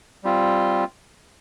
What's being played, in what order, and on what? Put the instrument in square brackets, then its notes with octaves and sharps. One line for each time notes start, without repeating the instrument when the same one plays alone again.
[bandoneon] G3 C4 F4